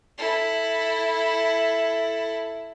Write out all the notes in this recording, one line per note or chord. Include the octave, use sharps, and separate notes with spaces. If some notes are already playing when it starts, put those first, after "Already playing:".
E4 A4